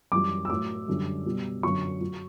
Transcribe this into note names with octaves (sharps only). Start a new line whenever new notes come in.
F#2 E3 G3 D6
E6
A2 F#3 D6
F#2 D3 G3
B2 G3
F#2 D3 F#3 C#6
F#3